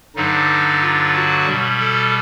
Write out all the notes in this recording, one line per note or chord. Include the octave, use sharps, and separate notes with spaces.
G2 D3 F#3 D#4
F4
F#4
B2 G3
A4